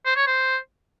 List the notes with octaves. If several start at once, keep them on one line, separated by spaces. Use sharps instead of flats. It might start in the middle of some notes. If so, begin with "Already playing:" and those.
C5
C#5
C5